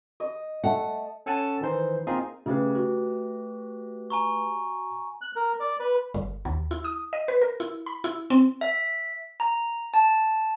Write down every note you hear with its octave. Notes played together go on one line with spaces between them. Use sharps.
D#5
A3 F#5
C#4 A4 F#5 G#5 A5
D#3 E3 D#4 C5
A#3 C4 D#4 F4 G#4
C#3 A3 G4 B4
F#4
G#5 A#5 C#6
F#6
A#4
D5
B4
G1
D#2
E4
D#6
D#5
B4
A#4
E4
B5
E4
C4
E5
A#5
A5